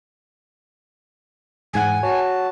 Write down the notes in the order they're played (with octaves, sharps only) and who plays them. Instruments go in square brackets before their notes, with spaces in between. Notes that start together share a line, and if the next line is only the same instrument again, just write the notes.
[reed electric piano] E2 G#2 F#5 [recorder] G#5
[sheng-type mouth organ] F#4 A5 [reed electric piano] C#5